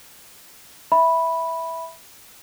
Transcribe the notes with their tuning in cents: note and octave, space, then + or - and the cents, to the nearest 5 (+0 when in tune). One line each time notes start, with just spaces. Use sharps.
E5 -5 B5 -5